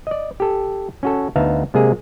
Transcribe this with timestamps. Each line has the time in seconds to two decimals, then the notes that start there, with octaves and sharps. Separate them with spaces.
0.07 D5 D#5
0.40 G4 A4
1.03 C#4 F#4 A4
1.36 D2 B3 D#4 E5 F5 A5
1.74 C3 G#3 A#3 G#4